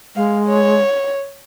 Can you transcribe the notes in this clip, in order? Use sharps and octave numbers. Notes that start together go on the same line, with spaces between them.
G#3 F5
C#5